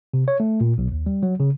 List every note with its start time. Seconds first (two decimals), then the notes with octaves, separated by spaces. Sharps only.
0.14 C3
0.28 C#5
0.40 A3
0.61 A#2
0.78 B1
0.92 D#2
1.06 G3
1.23 F#3
1.40 C#3